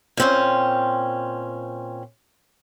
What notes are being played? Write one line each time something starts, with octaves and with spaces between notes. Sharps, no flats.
A#2 C4 C#4